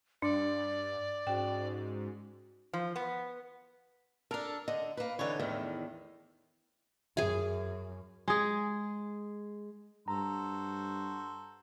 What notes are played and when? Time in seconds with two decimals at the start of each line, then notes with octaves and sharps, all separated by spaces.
0.22 G2 D4 D5
1.27 G#2 C#4 F#4 G5
2.73 F3
2.96 B3
4.31 D4 A4 A#4 A#5
4.68 D3 D#5
4.97 A#3 B4
5.19 D3 E3 D#4 C#5
5.40 E2 A2 D#3 A3
7.17 F#2 G#4 E5 G#5
8.28 G#3 G#4
10.08 G2 F#4 A4 C5 A#5